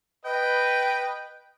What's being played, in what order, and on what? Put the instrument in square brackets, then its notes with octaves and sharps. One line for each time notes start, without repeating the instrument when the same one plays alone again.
[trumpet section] B4 D#5 [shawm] G5